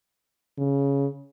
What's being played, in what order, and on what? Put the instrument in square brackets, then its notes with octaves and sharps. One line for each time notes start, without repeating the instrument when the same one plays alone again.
[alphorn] C#3